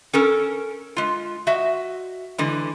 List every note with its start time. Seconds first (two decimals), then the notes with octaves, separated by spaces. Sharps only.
0.13 C#4 A4 A#4
0.97 G#3 F4
1.47 F#4 D#5 E5
2.38 D3 E3 G#3